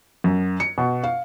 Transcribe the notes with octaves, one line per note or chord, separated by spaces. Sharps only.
F#2
C#7
B2
F5